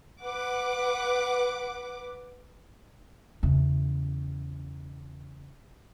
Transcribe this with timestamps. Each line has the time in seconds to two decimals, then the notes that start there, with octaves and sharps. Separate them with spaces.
0.25 B4 F#5 D6
3.43 E2 C#3